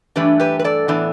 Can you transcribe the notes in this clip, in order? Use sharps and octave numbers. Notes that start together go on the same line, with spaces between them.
G2 E3 A3 D4 G4 B4
G4 B4
B4
A4 D5
A2 E3 B3 D4